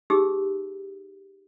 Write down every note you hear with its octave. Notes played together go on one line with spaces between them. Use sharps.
D#4 G4 G#4 E6